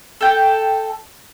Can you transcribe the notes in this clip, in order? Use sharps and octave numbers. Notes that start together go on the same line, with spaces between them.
A4 G5